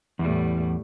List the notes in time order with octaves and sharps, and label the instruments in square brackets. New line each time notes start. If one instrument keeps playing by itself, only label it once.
[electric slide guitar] E2 [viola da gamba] A2 G3